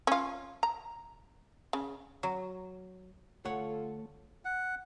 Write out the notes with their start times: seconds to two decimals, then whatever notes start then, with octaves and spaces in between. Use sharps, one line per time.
0.07 C#4 F4
0.63 A#5
1.73 C#3
2.23 F#3
3.45 D3 A3 F4 A4 C#5 F#5
4.45 F#5